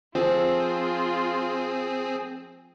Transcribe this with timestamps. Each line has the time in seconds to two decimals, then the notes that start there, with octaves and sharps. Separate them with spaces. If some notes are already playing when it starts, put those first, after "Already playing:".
0.15 F3 C4 F4 G#4 A4 A5